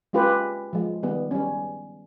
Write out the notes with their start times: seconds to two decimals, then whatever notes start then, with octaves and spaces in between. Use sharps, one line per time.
0.13 G#3 C#4 F4 G4 B4
0.73 F3 G#3
1.03 D#3 G3 B3
1.31 G3 C#4